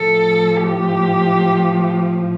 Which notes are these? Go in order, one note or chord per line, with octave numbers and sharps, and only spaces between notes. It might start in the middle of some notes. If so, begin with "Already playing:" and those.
Already playing: A2 F3 A4
G4